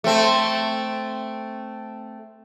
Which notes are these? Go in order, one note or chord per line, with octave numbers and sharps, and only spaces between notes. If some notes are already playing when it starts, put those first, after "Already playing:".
A3 C4